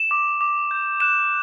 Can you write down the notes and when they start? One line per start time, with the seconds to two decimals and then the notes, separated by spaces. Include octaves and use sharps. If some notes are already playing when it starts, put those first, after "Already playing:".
Already playing: E7
0.11 D6
0.41 D6
0.71 G6
1.00 F#6 E7